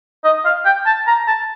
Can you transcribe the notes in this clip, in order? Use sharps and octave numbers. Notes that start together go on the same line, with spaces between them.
D#5
F5
G5
A5
A#5
A5